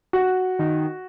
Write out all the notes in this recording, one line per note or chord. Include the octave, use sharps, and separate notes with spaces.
F#4
D#3